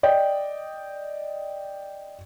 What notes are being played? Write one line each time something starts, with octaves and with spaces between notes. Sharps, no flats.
D5 D#5 G5